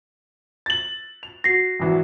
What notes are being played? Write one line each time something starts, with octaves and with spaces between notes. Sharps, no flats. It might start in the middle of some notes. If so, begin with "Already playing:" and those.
A6 F#7
F7
F#4 A#6 C7
G#1 E3 F#4